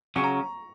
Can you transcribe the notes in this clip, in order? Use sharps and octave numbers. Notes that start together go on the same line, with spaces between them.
C#3 F#3 C#4 C#6
A#5